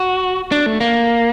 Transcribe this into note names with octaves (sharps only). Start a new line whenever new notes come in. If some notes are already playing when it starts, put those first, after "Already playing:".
Already playing: F#4
D4
A3
A#3